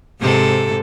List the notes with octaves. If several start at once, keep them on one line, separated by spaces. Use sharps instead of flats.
G#2 C3 A4